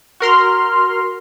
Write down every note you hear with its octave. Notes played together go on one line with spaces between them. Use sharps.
F#4 A#4 C6 F6